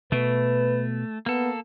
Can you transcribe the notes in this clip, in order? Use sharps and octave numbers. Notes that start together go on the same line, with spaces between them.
B2 A3 B4
A#3 B3 A4